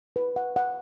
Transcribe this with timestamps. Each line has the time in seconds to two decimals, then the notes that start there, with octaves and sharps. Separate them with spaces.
0.16 B4
0.36 F#5
0.56 F#5